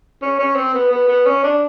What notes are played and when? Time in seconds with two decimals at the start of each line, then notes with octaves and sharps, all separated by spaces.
0.22 C#4
0.39 C#4
0.56 C4
0.74 B3
0.91 B3
1.08 B3
1.26 C#4
1.44 D4